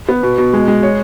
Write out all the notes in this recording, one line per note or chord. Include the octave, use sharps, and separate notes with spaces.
B3
B2
B2
G#3
G#3
C#5